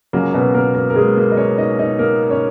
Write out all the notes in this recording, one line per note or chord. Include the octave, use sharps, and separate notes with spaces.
C#2 C#3 F#3 A#3
B2 B3
A#3 A#4
A#3 A#4
A#4
G#3 G#4
A#3 A#4
D#5
C#4 C#5
D#4 D#5
D#4 D#5
A#3 A#4
C#4 C#5